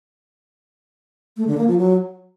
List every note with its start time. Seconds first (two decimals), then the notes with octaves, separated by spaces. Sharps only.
1.37 A3
1.47 D3
1.57 A#3
1.68 F3
1.78 F#3